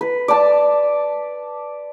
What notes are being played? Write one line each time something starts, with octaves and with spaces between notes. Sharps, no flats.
B4
D5 A5